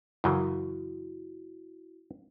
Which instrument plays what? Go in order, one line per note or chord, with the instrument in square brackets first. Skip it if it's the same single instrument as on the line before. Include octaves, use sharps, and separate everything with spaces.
[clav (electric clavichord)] F#2 C#3 E3 [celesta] E4 F#4